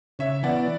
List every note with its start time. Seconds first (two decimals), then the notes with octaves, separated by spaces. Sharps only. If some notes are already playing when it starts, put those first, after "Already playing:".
0.19 C#3 C#5 E5
0.43 E3 B3 D5 F#5